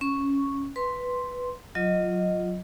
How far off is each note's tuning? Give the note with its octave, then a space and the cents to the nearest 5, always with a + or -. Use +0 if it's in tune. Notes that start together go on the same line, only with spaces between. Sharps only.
C#4 +0 C#6 +0
B4 +0 C6 +0
F#3 -15 F4 +0 D#5 +0